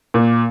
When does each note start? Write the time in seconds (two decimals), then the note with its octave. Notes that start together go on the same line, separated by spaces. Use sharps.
0.14 A#2